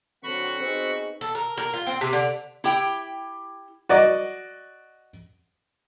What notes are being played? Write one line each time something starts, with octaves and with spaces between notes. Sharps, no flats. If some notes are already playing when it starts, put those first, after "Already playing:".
D3 F#3 C4 F#4 B5 C#6
B3 C4 D#4 G#4
A4
A#4
A#4
F4
C4
C3
D3
E4 G4 G5
F#4 D5 D#5